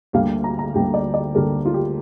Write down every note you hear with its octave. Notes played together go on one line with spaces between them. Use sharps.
D2 D3 G3 A#3 F5
A#5
A#5
D2 D3 G3 A#3 G5
D5
D5
D2 D3 G3 A#3 A#4
F4
G4